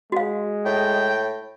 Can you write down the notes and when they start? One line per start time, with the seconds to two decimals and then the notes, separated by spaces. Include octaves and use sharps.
0.12 G#3 F#4 F5
0.65 A2 G5